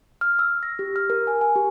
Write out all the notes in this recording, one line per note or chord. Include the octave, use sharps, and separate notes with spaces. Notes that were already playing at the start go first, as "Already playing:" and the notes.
F6
E6
A#6
G4
F6
A#4
G#5
G#5
G4